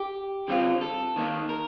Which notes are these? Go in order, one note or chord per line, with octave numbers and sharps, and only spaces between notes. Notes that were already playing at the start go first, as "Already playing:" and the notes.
Already playing: G4
D3 G3 C4 F4
A4
D#3 A#3 D#4
A#4